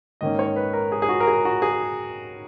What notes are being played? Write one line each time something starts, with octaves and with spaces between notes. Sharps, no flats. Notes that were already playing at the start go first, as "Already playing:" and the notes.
G#2 D#3 A#3 C#4 D#5
C#5
B4
A#4
G#4
G#4
F#4
A#4
G#4
F#4
G#4